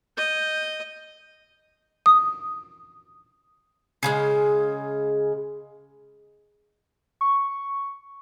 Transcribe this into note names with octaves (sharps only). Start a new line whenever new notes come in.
D#5 G6
D#6
C#3 F3 G#3
C#6